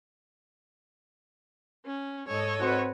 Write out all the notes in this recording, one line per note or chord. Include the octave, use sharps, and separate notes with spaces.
C#4
G#2 A4 C#5 D#5
C4 F#4 B4 C5 F#5